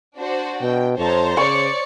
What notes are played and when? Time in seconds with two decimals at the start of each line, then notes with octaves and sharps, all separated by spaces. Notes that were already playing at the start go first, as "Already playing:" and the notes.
0.18 D4 F#4 C5
0.62 B2 G5
0.98 F2 C5 C#5 A5 A#5
1.37 C#3 C#5 D5 C#6 C#7